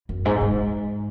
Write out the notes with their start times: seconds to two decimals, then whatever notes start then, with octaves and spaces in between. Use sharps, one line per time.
0.09 F#2
0.25 G#2
0.41 G#2